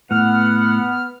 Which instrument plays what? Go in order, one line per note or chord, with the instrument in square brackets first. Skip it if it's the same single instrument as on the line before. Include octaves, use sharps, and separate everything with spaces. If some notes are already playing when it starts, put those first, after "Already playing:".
[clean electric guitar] A2 [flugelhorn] B3 [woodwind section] F#5 [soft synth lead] F6